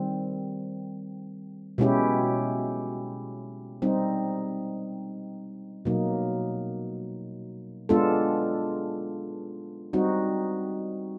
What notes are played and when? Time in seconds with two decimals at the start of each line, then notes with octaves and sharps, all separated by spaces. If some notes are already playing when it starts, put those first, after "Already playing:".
Already playing: D#3 G3 C4
1.78 B2 G#3 C#4 E4 G4
3.82 G3 C4 D#4
5.85 B2 F#3 A#3 D#4
7.89 G#3 B3 D4 F4 A4
9.93 G3 C4 D#4 F#4